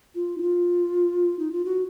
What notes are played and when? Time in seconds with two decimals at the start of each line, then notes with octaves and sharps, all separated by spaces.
0.15 F4
0.38 D#4
0.42 F4
1.39 D#4
1.52 F4
1.65 F#4